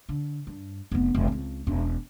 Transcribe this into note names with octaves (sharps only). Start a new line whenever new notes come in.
D3
G2
F1 B3
F1
C#2 C4
E1 C#4